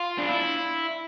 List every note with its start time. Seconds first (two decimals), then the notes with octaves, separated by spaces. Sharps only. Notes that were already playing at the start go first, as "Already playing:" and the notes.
Already playing: F4
0.18 D4
0.29 E4